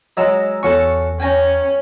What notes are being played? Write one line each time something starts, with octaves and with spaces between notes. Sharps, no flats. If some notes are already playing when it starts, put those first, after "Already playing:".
F#3 G#3 D#5 A#5 E6
E2 C#4 F#4 A4 C#6
C#4 G5 G#5 A#5